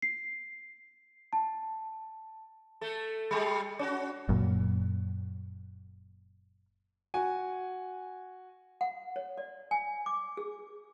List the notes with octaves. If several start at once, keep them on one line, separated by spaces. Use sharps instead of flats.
C7
A5
A3 A4
G3 G#3 G4
C#4 F#4
F#1 F#2 A#2
F#4 G#5
F#5
C#5
D5
G#5
D6
G#4